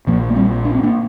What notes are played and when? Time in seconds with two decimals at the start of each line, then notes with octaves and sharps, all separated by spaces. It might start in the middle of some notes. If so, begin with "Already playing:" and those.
0.07 A#2 F3 A#3
0.12 A#1
0.30 A#3
0.36 G3 C4
0.65 D4
0.75 C4
0.83 A#3 D4